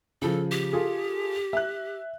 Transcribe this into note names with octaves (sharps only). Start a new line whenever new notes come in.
C#3 F3 A4
G4
F4 G#4 A4
E5 F#6